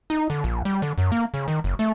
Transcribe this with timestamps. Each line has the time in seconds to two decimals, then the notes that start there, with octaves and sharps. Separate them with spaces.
0.10 D#4
0.30 D3
0.44 A#1
0.65 G3
0.82 D3
0.98 F#2
1.12 A#3
1.34 C#3
1.48 D#3
1.64 F#1
1.79 A3